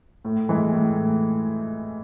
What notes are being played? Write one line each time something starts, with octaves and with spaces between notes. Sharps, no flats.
A2
E3 G#3
A2